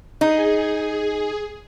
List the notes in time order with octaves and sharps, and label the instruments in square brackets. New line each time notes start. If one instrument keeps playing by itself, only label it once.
[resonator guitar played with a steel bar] D#4 [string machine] G#4